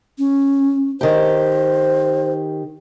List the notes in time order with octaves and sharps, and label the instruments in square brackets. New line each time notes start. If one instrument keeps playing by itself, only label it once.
[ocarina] C#4
[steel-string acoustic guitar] D#3 G4 [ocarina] C5